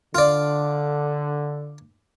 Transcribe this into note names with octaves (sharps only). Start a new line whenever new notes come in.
D3 F4 D5